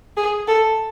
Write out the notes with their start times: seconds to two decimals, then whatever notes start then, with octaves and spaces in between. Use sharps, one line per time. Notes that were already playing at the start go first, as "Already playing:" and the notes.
0.17 G#4
0.48 A4